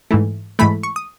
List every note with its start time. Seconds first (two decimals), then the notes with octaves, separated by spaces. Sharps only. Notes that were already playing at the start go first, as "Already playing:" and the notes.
0.11 G#2 E3 A3
0.59 G#2 E3 A3 B5
0.83 C#6
0.96 D#6